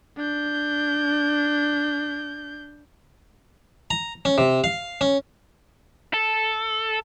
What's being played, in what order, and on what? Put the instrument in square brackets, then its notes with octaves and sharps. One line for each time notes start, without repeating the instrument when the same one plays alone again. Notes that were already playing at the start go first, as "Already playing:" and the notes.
[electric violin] D4 G6
[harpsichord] A#5
C#4
C3
F5
C#4
[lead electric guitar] A4